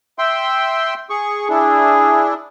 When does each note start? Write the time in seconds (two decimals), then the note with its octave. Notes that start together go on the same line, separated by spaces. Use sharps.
0.19 E5 G5 C6
1.10 G#4 C#6
1.49 D4 E4 G#4